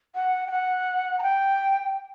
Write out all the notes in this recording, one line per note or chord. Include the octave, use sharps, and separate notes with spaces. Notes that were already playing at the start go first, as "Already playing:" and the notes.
F#5
G5
F#5
A#5
G5